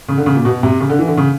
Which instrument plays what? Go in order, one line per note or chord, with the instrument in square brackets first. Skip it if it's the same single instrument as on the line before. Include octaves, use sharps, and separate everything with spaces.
[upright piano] C#3
D3
C#3
A#2
B2
C3
C#3
D3
E3
D3
C#3